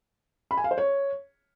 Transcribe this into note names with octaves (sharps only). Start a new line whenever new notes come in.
B5
G#5
F5
C5
C#5